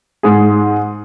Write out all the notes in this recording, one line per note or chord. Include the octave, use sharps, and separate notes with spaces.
G#2 G#4